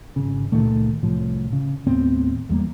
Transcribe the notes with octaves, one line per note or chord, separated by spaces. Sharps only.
G#1 C#3
C#2 A#2 D#3 A3
C2 A2 F3
C#3
D#2 A2 B3 C4
E2 G3 A#3